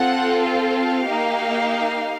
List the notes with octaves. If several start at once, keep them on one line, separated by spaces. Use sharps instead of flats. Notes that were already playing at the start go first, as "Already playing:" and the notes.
Already playing: C4 F4 A4 F#5
F5
A#3 D#4 G4